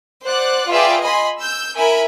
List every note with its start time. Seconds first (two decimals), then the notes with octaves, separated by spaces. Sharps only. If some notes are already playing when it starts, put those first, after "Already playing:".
0.24 C5 D5 F#5 F#6
0.69 F4 G#4 B4 D5 E5 G5
1.02 D#5 G#5 B5 C6
1.41 E6 G6
1.76 E4 A#4 E5 G#5 B5